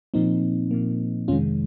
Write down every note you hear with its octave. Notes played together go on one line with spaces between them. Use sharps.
A#2 F3 A#3 C4 D#4
A#2 F3 A#3
F2 C3 D#3 G#3 C#4 F4